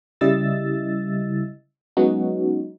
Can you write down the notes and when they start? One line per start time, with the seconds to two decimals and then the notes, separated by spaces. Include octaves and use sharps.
0.21 C#3 G3 E4 D#5 E6 A6
1.97 F#3 G#3 B3 C#4 D#4 F#4